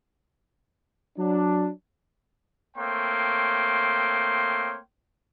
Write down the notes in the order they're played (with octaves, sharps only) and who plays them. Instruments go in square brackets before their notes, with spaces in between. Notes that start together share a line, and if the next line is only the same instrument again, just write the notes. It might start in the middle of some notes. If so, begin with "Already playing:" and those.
[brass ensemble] F#3 D4
[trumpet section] A3 A#3 C4 C#5 G5 C6